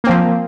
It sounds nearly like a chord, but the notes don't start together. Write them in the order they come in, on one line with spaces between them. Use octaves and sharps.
A#3 C4 F3